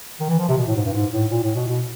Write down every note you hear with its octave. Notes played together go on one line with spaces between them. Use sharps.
D#3
E3
F3
C3
B2
A2
G#2
G2
G#2
A2
A#2
A2
B2
B2